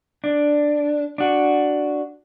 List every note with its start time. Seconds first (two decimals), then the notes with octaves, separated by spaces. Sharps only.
0.24 D4
1.18 D4 F#4